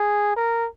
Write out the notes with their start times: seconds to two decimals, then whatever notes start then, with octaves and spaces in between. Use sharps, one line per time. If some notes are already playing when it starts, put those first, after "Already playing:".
Already playing: G#4
0.36 A#4